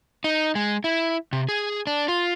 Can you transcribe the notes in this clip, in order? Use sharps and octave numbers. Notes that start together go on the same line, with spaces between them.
D#4
G#3
E4
C3
G#4
D4
F4